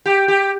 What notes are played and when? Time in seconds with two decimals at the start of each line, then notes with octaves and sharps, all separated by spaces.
0.06 G4
0.28 G4